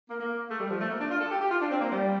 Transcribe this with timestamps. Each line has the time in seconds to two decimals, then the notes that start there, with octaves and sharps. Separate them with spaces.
0.09 A#3
0.20 A#3
0.50 A3
0.60 G3
0.70 F3
0.81 A3
0.91 A#3
1.01 D4
1.11 F4
1.21 A4
1.31 G4
1.41 G4
1.51 F4
1.61 D4
1.71 C4
1.81 A#3
1.92 G3